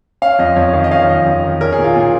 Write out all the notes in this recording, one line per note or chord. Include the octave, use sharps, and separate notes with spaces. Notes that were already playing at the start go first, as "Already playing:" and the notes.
C#4 F5
F2 D#5
F2 C#5
D#3 F5
D#5
C#4 F5
F2 D#5
F2
D#3
C#4 A#4
G#4
A#2
F4
A#2